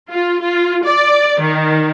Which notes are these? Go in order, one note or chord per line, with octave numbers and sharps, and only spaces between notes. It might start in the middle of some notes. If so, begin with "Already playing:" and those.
F4
F4
D5
D#3